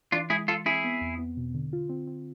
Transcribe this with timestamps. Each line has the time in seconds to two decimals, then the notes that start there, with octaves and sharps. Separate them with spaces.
0.12 E3 D4 F4
0.30 G#3 E4 G#4
0.48 G#3 F4 A4
0.65 C4 E4 G#4
0.84 B3
1.01 E2
1.19 B3
1.37 B2
1.54 D3
1.73 F4
1.89 C4
2.07 C4